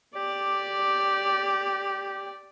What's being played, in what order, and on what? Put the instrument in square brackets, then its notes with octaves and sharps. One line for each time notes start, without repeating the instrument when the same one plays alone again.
[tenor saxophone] G4 [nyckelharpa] D5